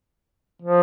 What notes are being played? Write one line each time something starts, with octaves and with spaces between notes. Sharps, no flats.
F3